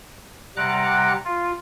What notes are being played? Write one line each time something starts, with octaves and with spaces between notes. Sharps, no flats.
C3 G3 F#5 A#5 D6 F#6
F4